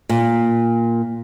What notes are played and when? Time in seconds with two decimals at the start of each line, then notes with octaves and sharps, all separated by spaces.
0.09 A#2